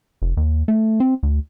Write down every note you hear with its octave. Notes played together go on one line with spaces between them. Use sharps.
F1
D#2
A3
C4
D2